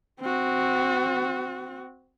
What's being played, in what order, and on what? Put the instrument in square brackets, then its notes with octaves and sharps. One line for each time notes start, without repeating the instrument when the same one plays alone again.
[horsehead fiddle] C4 F#4